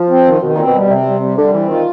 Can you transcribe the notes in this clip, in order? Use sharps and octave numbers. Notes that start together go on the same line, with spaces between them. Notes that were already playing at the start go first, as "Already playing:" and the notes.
Already playing: F3
C4
D#3
B2 D#3
A#2 C4
B2
G3
C3 C4
G3
G3
D3 G3
E3 C4
D#3 F4